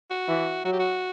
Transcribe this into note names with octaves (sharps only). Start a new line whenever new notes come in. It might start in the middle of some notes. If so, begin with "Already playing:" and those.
F#4
E3
F#3 F#4
G4
F#4